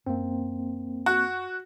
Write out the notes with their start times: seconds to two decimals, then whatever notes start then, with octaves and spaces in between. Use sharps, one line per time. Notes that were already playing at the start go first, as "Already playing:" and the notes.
0.06 F#2 A#3 C4 C#4
1.06 F#4